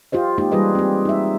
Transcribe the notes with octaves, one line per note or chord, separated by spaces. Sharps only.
F4 G4 C5 D#5
G#3 A#3 D#4 F4 G4
E3 G3 F4 G#4 B4 D#5
C4 G4
D#4 E5